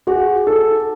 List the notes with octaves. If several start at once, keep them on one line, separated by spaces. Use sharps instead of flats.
F#4 G#4
D#4 A4